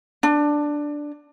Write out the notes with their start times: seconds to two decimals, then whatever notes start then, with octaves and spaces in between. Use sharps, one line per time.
0.23 D4